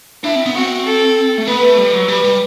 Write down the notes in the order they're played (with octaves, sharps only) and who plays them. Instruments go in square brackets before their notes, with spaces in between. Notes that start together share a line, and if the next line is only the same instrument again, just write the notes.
[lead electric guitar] D4 [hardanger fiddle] E4
[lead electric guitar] C4
B3
[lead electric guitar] C4 [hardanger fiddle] F#4
[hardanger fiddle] A4
[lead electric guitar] A3
[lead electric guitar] B3 [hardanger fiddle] B4
[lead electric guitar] A3
G3
F#3
[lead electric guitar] G3 [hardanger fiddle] B4
[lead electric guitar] G3